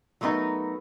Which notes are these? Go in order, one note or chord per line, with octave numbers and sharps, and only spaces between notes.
F#3 G3 A3 B3 D#4 A#4